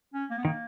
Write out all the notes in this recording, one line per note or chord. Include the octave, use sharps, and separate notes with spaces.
C#4
A#3
B3
D#3 A#3